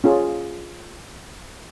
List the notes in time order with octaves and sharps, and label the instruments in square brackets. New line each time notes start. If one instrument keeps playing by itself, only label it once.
[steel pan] C#4 F4 G#4